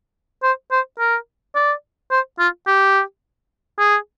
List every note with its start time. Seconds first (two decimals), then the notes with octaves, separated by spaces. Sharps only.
0.43 C5
0.72 C5
0.99 A#4
1.55 D5
2.11 C5
2.39 F4
2.67 G4
3.79 G#4